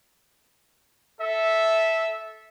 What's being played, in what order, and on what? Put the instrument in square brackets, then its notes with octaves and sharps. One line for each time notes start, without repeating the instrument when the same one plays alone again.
[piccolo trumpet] A4 [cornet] E5